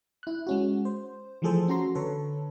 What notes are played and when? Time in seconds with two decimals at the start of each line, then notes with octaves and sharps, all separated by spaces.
0.23 E4 F#6
0.47 G#3 C#4 F#4
0.85 C5
1.42 E3 F3 A3 G#4 A4 C5
1.68 C#4 F#4 A#5 C6
1.95 D3 A4 B4 C#5